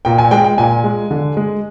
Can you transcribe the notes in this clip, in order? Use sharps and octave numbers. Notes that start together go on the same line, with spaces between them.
A#2 G5
G#5
G#3 G5
G5
A#2 G#5
G#3
D3
G#3